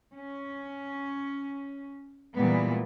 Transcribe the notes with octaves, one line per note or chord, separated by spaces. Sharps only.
C#4
A#2 E3 G3 G#3 B3